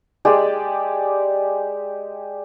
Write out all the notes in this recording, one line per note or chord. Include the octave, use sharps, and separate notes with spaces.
G#3 G4 D5